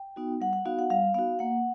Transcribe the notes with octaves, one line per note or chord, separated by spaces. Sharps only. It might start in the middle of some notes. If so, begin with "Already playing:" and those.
Already playing: G5
B3 D#4 F#4
G3 F#5
F#5
B3 D#4 F#4 F5
F#5
G3 F5
B3 D#4 F#4 F5
A#3 F#5